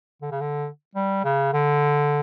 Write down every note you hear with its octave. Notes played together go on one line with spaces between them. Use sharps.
D3
C#3
D3
G3
C#3
D3